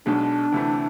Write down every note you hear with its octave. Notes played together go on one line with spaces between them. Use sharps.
B1 B2 G#3 D4
D2 C3 E3 A3